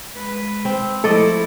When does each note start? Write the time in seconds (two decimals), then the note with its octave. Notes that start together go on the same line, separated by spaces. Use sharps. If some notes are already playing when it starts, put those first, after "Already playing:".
0.15 G#3 B4
0.65 C4
1.04 F3 A3 E4 A4 D5 D#5